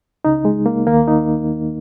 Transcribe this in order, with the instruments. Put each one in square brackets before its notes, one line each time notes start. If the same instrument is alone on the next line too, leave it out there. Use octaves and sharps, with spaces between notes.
[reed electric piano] C#2 C#3 D#4
G#3
A#3
D#2 D#3 A#3
D#4